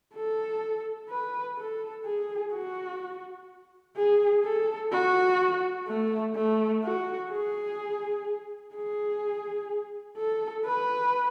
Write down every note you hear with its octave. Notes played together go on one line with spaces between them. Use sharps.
A4
B4
A4
G#4
F#4
G#4
A4
F#4
A3
A3
F#4
G#4
G#4
A4
B4